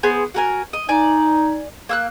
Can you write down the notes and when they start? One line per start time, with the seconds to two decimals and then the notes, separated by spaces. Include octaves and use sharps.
0.03 B3 G#4 C5
0.34 F#4 A#4 G#5
0.73 D#5
0.89 D#4 D5 G#5
1.89 A#3 E6 F#6